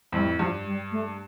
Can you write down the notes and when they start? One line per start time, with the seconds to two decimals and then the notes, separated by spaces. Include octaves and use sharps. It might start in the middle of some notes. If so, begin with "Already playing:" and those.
0.12 F2 A2 G3
0.39 G2 F3
0.65 G3
0.92 A3